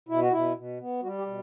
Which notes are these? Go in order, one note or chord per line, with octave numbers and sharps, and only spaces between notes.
B2 E4
F#4
B2 E4
B2
B3
G3 F#4
G4
B2